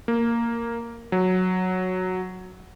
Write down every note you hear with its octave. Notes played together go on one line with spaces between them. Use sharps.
A#3
F#3